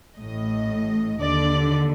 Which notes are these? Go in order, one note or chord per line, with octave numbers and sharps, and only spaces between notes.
A1 A2 D#5
D#2 D3 D5